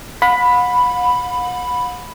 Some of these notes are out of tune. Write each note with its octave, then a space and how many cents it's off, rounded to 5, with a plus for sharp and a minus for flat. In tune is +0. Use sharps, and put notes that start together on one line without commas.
F#5 -45 B5 +5